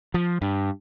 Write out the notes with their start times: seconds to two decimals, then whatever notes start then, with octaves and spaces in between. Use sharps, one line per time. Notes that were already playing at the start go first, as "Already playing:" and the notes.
0.14 F3
0.42 G2